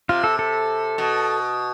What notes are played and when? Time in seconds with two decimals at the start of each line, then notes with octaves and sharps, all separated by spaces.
0.09 C3 F4
0.24 A4
0.39 A4
0.98 B2